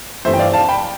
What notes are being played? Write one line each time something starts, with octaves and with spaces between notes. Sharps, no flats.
G2 E3 A3 C4 C5 E5
G5
D5 F5
F5 A5
G5 B5